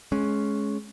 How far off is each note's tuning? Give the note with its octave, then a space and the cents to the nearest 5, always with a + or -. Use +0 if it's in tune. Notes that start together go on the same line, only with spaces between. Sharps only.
G#3 +25 C#4 +0